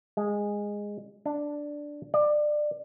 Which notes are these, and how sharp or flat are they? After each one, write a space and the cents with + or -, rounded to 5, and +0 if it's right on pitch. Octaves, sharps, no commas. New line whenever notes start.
G#3 -15
D4 +0
D5 +25